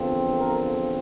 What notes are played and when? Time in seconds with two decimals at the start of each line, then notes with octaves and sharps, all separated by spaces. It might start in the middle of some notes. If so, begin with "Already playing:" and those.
Already playing: E2 D3 F3 C4
0.39 A#4